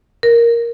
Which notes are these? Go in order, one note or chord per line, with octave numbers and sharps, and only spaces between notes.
A#4